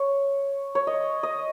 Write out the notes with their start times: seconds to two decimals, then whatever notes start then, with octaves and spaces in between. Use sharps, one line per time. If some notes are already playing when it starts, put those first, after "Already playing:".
Already playing: C#5
0.75 C#5
0.87 D#5
1.23 D#5